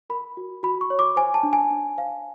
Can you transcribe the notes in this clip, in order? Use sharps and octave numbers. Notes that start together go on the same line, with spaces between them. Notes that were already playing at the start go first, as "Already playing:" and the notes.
A#4 B5
F#4
F#4 B5
C#6
C#5
D6
C5 G#5
A5
D4
G#5
D4
C5 F5